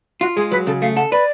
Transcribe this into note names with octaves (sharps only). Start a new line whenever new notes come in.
F4 F#4
G#3 G#4
F#3 B4
C#3 A4
A3 F5
A4 F#5
B4 D5